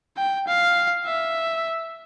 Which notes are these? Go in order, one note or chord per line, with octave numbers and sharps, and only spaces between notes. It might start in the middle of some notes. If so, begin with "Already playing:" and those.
G5
F5
E5